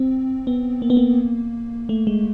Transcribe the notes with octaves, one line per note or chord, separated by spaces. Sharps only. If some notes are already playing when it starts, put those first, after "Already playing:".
Already playing: C4
B3
A#3
B3
A#3
A3
G#3